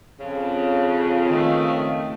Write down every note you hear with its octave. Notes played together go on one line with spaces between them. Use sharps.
F2 C#3
D#3 A3